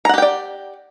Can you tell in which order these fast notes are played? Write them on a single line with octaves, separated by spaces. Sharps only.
A#5 F#5 G4 G5 D5